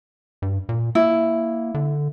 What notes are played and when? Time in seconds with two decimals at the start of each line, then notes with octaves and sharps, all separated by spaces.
0.42 G2
0.69 A#2
0.95 A#3 E4
1.74 D3